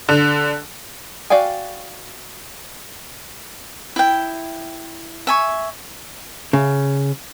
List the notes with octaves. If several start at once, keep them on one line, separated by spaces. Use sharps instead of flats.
D3
F#4 D5 F5 G5 G#5
E4 G5
E5 G#5 C#6
C#3